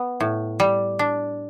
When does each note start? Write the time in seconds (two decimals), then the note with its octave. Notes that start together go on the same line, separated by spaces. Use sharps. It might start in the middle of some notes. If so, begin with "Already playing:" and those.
Already playing: B3
0.20 A2
0.60 G3
0.99 D4